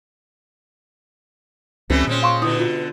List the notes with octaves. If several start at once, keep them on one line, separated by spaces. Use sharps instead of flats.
C#2 E3 G3 A3 C4 C#4
A#2 G#3 C4 C#4
F5 C6 C#6
B2 D3 E4 D#6
F4